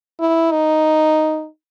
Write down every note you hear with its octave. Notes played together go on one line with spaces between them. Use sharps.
E4
D#4